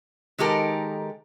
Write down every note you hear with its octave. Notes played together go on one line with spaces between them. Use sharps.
D#3 G#3 D#4 G4 A4 A#4